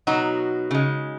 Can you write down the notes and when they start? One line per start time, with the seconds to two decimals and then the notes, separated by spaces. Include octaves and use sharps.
0.07 B2 F#3 D#4 F#4
0.71 C#3 G#3